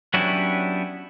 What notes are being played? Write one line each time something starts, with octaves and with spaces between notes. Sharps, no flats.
F#3 B3 C#4 D4 E4 G4